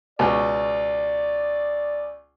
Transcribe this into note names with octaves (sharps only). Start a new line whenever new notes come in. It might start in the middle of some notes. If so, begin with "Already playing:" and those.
C#2 B2 D5